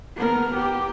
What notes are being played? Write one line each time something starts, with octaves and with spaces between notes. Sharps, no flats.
B3 A#4
G4